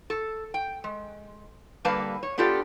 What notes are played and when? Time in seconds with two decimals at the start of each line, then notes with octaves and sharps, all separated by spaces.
0.10 A4
0.54 G5
0.84 G#3
1.85 D3 G3 A#3 B4 F5 A5
2.23 C#5
2.38 B3 D4 F4 G4 A4